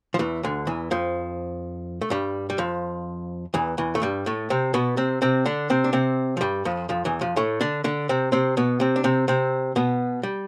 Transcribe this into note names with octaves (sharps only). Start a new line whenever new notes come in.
F3
E2 E3
D2 D3
E2 E3
F2 F3
A3
G2 G3
G3
F2 F3
E2 E3
E2 E3
A3
G2 G3
A2 A3
C3 C4
B2 B3
C3 C4
C3 C4
D3 D4
C3 C4
D4
C3 C4
F3
G2 G3
F2 F3
F2 F3
E2 E3
F2 F3
A2 A3
D3 D4
D3 D4
C3 C4
C3 C4
B2 B3
C3 C4
D4
C3 C4
C3 C4
B2 B3
G3